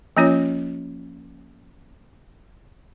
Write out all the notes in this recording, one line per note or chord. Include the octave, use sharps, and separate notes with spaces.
F3 A#3 C#4 F4 C#5